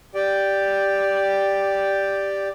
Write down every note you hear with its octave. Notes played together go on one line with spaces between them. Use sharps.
G4 D5 G5